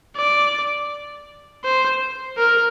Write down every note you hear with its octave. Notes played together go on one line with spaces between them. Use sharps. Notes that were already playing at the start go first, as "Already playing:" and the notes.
D5
C5
A#4